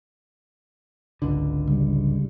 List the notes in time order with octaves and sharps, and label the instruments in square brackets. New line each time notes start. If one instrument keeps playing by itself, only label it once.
[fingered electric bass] G#1 C#2 D3
[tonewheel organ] C#3 G3